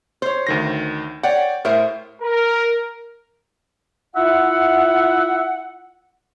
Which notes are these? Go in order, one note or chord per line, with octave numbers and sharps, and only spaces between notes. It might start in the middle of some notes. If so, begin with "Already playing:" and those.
C5 C#5
D2 D#3 A#6
C#5 D5 F#5 G5
A2 A#4 C5 E5
A#4
E4 F4 E5 F#5